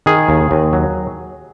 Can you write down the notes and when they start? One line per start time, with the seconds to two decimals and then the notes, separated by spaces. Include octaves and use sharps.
0.06 D#3 G#4
0.28 D#2
0.51 D#2
0.73 F#3